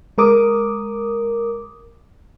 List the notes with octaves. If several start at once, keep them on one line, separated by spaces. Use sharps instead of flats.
G#3 A#4 D6 D#6